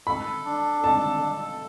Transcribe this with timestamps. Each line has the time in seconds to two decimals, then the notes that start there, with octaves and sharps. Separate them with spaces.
0.07 A4 B5
0.45 D4
0.84 A4 A5
1.22 A4